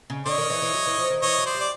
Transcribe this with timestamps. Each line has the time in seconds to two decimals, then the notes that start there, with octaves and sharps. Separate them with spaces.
0.10 C#3
0.26 D3 C#5 D#5
0.38 D#3
0.50 E3
0.62 E3
0.74 F#3
0.87 E3
0.98 F3
1.10 D#3
1.22 E3 C#5 D#5
1.38 F#3
1.46 C5 D5
1.55 G3
1.60 D5